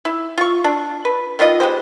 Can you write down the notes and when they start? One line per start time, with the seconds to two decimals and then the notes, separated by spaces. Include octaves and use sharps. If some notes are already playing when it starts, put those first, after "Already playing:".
0.05 E4
0.38 F4 C#6
0.64 D4
1.05 B4
1.39 D#3 B3 F4 D#5
1.60 G#3 B3 G4 C5